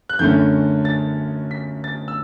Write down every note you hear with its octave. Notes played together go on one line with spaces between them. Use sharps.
F#6
F#2 D3 A3 C#4 G6
A6
B6
A6
E6